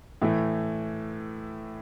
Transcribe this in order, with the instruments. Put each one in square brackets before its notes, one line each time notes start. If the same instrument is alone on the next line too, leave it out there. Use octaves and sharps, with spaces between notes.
[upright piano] A2 E3 A3